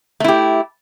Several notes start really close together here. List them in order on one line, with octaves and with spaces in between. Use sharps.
A3 E4 G4